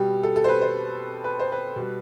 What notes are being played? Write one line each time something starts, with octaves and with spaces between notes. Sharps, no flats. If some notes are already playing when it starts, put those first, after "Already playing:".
Already playing: B2 G3 G4
A4
A4
C5
B4
C5
B4
C5
B4
B2 G3